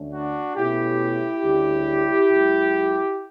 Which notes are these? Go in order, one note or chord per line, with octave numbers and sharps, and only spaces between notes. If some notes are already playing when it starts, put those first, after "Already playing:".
Already playing: D2 D3 A3 C#4
D4 F#4
B2 A3 C#4 E4 G4
D2 C#3 G3 C#4
C#2 C#3 F#3